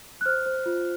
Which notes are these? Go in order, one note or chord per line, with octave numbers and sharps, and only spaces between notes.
F#6
C5 F6
C5
F4